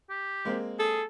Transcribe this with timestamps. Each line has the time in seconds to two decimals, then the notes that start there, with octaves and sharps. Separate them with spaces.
0.10 G4
0.45 G#3 A#3 C4
0.79 G#4 A4